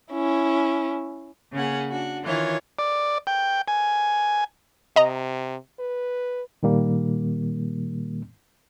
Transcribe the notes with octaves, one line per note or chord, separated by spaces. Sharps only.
C#4 E4
C#3 A#3 C#4 G#4 F#5
D4 F#4
D#3 E3 F4 C#5
D5
G5
G#5
C3 D#5 A#5
B4
A#2 D#3 G3 A#3